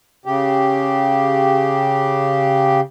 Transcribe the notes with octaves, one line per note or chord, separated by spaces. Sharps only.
C#3 G4